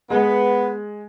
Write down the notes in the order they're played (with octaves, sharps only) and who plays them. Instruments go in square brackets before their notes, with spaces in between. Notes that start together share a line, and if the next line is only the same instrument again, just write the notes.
[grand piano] G#3 [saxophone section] B3